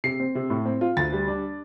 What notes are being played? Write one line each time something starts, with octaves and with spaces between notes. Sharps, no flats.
C3 C7
C4
C3
A2
C4
F4
D2 A6
G3
D4